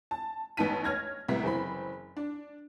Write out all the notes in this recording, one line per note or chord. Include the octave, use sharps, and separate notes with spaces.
A5
A1 B3 D#4 A5 B6 D#7
C#5 F6 G#6 A#6
C2 A2 C3 B3 B6
F#1 E3 C4 B5
D4